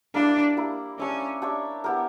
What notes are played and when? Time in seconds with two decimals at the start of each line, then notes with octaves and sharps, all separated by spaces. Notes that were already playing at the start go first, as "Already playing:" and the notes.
0.14 G3 A#3 D4 E4 A#4
0.57 G3 A#3 E4 A#4
0.99 C#4 D4 G4 C#5 E5
1.42 D4 G4 C#5 E5
1.84 B3 E4 G4 A#4